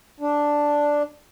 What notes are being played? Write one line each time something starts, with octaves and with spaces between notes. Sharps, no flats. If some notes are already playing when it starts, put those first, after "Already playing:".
D4